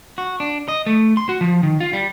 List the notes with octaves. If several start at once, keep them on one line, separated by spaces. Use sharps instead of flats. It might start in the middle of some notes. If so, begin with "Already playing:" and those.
F#4
D4
D#5
A3
C6
F#4
F3
D#3
F4
G3